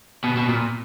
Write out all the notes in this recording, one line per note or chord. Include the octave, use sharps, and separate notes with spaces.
B2
B2
A#2